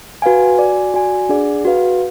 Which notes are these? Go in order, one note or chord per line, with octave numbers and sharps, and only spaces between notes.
F#4 B4 F5 G#5
F#4 D5 G#5
F#4 D5 G#5
D4 G#4 D5 F#5
F#4 B4 F5